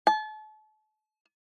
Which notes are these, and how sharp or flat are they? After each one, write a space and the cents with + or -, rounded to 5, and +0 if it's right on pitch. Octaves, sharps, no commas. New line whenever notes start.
A5 -35